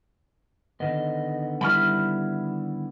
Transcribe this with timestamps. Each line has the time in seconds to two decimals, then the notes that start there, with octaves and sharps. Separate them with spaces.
0.80 D3 D#3 B3 D#5
1.61 G3 E4 B5 C6 F6